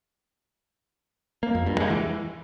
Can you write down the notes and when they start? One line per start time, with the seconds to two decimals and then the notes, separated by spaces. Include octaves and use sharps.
1.43 A#3
1.55 F2
1.66 G2
1.78 G#3
1.90 E3